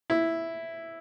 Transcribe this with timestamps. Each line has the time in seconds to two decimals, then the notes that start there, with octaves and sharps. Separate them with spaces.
0.10 E4